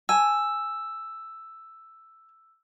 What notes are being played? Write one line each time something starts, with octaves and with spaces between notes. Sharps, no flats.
G#5 A5 E6